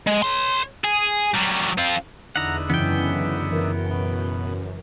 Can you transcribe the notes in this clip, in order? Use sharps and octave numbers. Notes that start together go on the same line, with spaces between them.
G#3
C#5 C6
G#4
F#3 G3
C4 F4
E2 D3 D#4 E4 F#5 A#5 F#6
F#2 C#3 E3 B3 C#4 G5
E3 A#4
B2